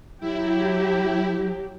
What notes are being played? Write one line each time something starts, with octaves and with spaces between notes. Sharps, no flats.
F#3 E4 G4